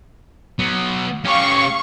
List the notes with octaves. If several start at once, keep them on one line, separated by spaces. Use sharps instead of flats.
F#3 B3
C#4 G4 F5 C#6